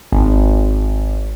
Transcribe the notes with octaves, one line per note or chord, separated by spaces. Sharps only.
G#1